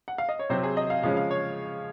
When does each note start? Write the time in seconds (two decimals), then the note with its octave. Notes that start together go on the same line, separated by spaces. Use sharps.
0.08 F#5
0.18 F5
0.29 D#5
0.39 C#5
0.50 C3 F#3 C4 C5
0.63 G#4
0.77 D#5
0.90 F5
1.03 C#3 F3 G#3 C#4 F5
1.17 F5
1.31 C#5